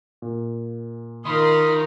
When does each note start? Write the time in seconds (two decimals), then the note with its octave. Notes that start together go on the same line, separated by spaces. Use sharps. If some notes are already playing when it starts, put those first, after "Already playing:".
0.22 A#2
1.25 D#3 F4 A#4 B5 C6 D#6